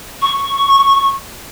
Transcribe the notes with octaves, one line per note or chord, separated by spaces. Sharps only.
C#6